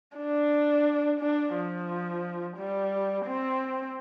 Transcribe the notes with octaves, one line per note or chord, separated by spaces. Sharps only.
D4
D4
F3
G3
C4